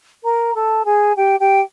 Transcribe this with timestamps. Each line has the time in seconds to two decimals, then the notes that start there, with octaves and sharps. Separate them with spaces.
0.23 A#4 A#5
0.54 A4 A5
0.85 G#4 G#5
1.16 G4 G5
1.39 G4 G5